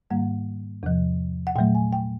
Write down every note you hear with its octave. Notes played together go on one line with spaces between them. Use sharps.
G#2 D#3 G3 A#3 F#5
E2 C3 F3
F#5
A#2 F#3 A3 G5
G#5
G5